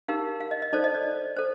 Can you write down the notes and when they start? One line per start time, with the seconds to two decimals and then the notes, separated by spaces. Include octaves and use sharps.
0.08 D#4 G4 A#4 F5
0.40 F5
0.51 D#5
0.62 D#5
0.73 D#4 A4 C5 D5
0.84 D#5
0.94 D5
1.36 A4 C5